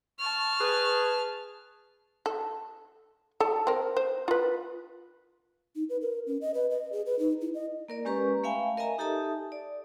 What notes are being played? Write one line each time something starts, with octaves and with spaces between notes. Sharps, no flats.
A5 C#6 F6
G#4 B4
A4
A4 A5
C4 A#4
C5
F4 B4
D#4
B4
A#4
C#4
D#5
B4
D#5
G#4
B4
D#4
E4
D#5
A#3 A#4 D5
G#3 C#4 G4 B4 A#5 C#6
A3 E5 F5 G5 G#5 B5
A#4 D#5 E5 G#5 A#5
D#4 G4 A4 E5 A5 D#6
D5